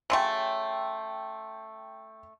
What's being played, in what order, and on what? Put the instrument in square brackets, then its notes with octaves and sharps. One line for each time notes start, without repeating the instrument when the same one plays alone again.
[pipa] C#3 F#3 A3 [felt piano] G5 C6 E6